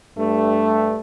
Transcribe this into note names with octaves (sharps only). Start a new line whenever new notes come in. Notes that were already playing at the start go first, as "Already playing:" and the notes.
G2 A3